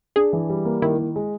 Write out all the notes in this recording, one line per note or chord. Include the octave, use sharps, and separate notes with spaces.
D4 G#4
E3
G3
A#3
D#3 E4
D#3
G#3